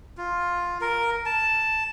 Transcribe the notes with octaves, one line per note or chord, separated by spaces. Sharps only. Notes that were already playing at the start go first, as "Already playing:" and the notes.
F4
A#4
A5